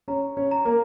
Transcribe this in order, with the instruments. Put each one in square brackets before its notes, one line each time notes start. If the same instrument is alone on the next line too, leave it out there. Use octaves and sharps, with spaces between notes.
[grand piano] C#4 C#5 [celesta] A#5
[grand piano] C#4 C#5
[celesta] A#5
[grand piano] A#3 A#4